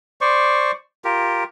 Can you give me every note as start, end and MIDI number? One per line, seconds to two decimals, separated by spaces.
0.21 0.72 72
0.21 0.72 74
0.21 0.72 85
1.04 1.44 65
1.04 1.44 67
1.04 1.44 70